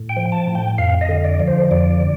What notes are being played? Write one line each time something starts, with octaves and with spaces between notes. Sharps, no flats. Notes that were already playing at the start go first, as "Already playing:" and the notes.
Already playing: A2
G5
F3
A5
A2
G5
F2 F5
D#5
D3
D5
F3
C5
F2 D5
D3